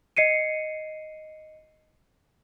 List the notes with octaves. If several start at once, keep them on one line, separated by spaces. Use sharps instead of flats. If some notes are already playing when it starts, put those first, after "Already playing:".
D#5 C7 C#7 D#7